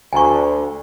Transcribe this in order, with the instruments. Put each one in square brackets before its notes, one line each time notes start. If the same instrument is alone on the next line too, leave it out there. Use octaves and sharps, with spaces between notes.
[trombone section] D2 [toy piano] G#5 A#5 C#6